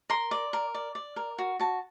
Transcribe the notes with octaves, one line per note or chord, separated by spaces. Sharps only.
A#4 C6
D5
A#4
D5
D5
A#4
F#4
F#4 A5